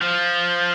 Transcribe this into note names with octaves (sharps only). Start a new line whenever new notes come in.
F3